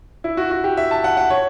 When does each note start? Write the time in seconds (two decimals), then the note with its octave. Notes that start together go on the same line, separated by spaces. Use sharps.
0.24 E4
0.37 F#4
0.51 F#4
0.64 G4
0.77 E5
0.91 A5
1.04 F#5
1.17 F#5
1.30 C#5